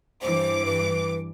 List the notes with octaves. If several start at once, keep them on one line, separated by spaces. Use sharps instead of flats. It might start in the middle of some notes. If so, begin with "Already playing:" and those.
G2 E3 C5 D6
B4